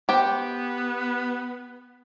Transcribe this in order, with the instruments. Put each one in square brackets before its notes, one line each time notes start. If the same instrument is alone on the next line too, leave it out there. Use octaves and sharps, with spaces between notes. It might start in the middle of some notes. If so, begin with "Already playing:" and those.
[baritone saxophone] B3 [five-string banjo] G4 C5 G5